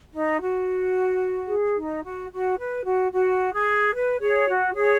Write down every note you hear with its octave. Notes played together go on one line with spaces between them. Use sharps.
D#4
F#4
G#4
D#4
F#4
F#4
B4
F#4
F#4
G#4
B4
G#4 C#5
F#4
G#4 C#5